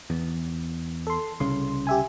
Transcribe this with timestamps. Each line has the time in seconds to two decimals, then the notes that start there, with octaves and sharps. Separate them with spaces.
0.10 E2
1.07 A4 C6
1.40 C2 C#3 C6
1.87 G4 E5 G#5